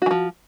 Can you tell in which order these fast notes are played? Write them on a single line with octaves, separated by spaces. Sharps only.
F#4 E3 F3